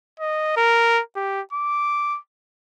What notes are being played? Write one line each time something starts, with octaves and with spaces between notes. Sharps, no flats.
D#5
A#4
G4
D6